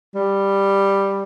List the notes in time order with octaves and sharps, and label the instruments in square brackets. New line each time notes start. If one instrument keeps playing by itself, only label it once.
[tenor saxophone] G3